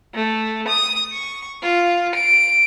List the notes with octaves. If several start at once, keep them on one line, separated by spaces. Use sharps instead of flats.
A3
D#6
C#6
F4
D7